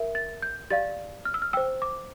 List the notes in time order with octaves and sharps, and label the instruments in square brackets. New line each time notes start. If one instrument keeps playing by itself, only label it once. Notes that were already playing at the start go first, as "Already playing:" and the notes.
Already playing: [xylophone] A#4 E5
A6
G6
G4 D5 F5 A6
F6
E6
F6
C5 G5 E6
D6